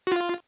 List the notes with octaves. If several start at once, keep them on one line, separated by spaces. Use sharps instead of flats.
F#4
F4